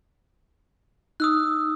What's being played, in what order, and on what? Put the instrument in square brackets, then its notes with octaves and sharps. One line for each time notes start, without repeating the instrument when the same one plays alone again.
[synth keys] D#4 [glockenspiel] D#6 E6 F#6